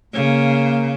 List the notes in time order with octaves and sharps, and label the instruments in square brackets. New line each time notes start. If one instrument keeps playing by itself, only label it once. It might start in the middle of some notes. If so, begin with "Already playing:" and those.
[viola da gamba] C#3 [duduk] A#3